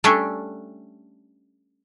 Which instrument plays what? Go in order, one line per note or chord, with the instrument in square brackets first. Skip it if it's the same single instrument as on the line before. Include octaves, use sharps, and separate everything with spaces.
[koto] G3 A3 C#4 D4 A4 E5